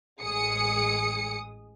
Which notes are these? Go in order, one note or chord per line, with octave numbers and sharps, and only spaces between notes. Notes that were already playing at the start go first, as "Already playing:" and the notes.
A1 G#3 G#4 D#6 C#7